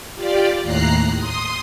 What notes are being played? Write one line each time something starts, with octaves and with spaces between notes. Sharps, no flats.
F4 G4 D5
D#2 A2 A#5 F#6 C7
C6 D#6